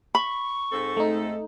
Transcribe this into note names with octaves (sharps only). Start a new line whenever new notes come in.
B5 C#6
G#2 C4 A4
A3 D#4